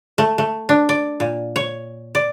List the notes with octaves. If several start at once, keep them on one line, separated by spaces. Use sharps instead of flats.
A3
A3
D4
D5
A#2
C#5
D5